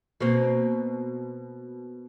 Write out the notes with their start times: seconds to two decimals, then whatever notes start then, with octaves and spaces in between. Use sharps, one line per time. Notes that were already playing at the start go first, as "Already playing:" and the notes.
0.20 B2 A#3 C4